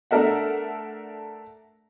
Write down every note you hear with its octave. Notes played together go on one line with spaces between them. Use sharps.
A3 D4 A4 A#4 E5 F#5